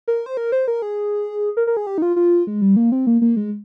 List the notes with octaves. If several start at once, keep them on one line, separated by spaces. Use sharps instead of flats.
A#4
C5
A#4
C5
A#4
G#4
A#4
A#4
G#4
G4
D#4
F4
F4
G#3
G3
A#3
C4
A#3
A#3
G#3